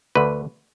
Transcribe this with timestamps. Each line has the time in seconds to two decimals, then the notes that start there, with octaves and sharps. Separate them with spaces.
0.15 D2 D3 B4